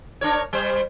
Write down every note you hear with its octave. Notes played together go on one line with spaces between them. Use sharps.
D4 A#4 C#5
G3 C5